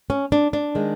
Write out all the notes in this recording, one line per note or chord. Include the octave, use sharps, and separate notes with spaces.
C#4
D4
D4
D#3 G#3